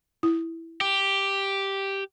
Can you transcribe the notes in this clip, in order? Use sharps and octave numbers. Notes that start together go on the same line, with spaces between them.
E4
G4